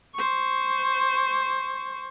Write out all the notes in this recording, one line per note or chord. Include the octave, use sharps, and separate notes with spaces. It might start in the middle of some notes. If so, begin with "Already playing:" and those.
C5 C#6